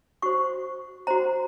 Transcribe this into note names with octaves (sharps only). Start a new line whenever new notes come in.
F#4 C5 C#6
F#4 C5 A#5